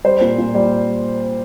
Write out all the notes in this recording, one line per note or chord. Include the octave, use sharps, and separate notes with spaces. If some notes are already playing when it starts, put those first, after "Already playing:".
G3 C5
A#2
A#2
G3